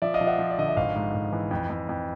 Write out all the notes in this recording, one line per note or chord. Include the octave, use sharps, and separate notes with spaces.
F3 D5 E5
D#5 F5
F3
E5 F#5
F3
D5
D3 D#5
E5
G#1 D#5 F5
G#2
G#1
E3
F2
F2
F2